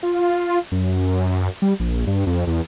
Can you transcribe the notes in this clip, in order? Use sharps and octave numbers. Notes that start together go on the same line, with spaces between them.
F4
F#2
G3
A#1
G2
F2
E2